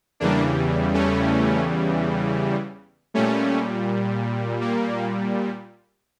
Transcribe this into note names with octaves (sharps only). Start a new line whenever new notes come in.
E2 C#3 E3 G3 A#3 D4
A3 C#4
A#2 G3 A3 C#4
A#3